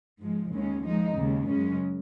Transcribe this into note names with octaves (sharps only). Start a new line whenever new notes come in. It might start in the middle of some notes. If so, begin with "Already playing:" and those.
G#2 F3 G#3
D#2 C#3 G#3 C#4
F3 G#3 D#4
D#2 C#3 G#3
F#2 C#3 G#3 C#4